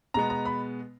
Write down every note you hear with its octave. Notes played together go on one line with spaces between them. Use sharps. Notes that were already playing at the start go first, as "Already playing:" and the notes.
B2 G#3 B3 A#5
A#5
B5